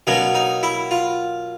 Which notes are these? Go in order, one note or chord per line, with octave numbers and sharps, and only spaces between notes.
B2 F#3 A#3 D4
D#4
E4
F4